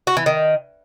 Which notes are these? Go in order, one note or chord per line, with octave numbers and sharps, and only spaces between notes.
F#4
E3
D#3